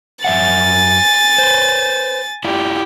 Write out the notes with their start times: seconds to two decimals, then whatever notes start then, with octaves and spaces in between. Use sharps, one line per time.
0.24 F#2 E5 F#5 G#5 A6
1.38 B4 C5
2.44 E4 F4 G4 D5